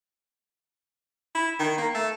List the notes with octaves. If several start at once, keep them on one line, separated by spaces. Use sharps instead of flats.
E4
D#3
A#3
A3